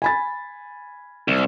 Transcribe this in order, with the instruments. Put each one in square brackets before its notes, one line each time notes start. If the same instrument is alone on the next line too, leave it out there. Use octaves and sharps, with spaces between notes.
[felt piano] G#5 B5 A6
[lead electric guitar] C2